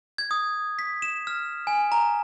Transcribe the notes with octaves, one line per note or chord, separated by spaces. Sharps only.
G#6
D#6
B6
E7
F6
G#5
A#5